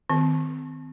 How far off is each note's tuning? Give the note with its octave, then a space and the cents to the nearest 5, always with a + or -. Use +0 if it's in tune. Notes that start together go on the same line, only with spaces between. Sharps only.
D#3 +0 C4 -30